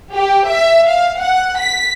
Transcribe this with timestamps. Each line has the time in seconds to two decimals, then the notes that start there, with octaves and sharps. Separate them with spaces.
0.13 G4
0.47 E5
0.87 F5
1.18 F#5
1.59 B6